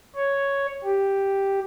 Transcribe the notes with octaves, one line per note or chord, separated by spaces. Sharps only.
C#5
G4